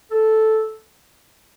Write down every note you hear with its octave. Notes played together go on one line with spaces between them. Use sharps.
A4